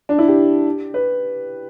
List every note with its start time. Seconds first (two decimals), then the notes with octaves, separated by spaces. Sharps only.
0.09 D4
0.18 E4
0.28 G4
0.94 B4